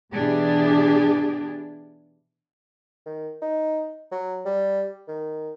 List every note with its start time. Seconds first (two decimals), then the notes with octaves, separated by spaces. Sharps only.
0.14 B2 E3 D4 G4 G#4
3.06 D#3
3.42 D#4
4.12 F#3
4.45 G3
5.08 D#3